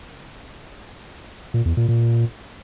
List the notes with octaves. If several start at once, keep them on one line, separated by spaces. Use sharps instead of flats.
A#2
E2
A#2
A#2